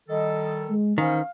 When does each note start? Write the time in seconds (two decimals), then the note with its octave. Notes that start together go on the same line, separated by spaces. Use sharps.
0.09 D#3 G3 A4 D#5
0.69 G#3
0.98 D#3 E3 C#4 C5 F5